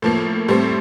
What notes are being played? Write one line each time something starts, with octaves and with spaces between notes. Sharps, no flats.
A2 F3 A#3
A2 G3 C4